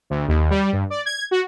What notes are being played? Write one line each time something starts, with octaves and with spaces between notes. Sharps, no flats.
D2
D#2
G3
G2
D5
G#6
F#4